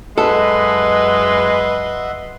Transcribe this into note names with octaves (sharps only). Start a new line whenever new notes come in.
F#2 G#3 A4 B4 D#5 E5 F#5 C6